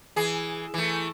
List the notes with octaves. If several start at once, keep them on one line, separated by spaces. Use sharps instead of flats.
E3 G#4
E3 A3